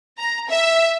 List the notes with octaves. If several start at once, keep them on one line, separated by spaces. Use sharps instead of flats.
A#5
E5